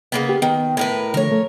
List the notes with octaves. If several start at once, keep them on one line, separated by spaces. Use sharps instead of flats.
C#3 A#3 B3
G4
D#3 B3
A2 A#4 B4
D3 F3 A3 A#4 C#5
A3